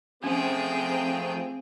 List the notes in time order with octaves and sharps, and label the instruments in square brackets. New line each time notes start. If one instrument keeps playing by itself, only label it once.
[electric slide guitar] F3 A3 [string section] C4 [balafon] C#4 [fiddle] G#4 G5